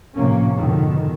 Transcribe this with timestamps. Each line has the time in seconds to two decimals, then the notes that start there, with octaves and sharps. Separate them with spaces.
0.15 A2 C3 F3 A#3 C#4
0.55 F2 G#2 B2 D3 D#3